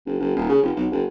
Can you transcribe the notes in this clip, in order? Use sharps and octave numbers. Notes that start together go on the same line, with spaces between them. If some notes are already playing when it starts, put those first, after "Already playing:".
F#1
F#1
D#1
C#3
F1
B1
F#1